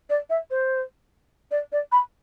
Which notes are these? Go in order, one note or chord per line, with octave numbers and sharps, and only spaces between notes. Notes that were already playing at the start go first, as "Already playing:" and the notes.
D5
E5
C5
D5
D5
B5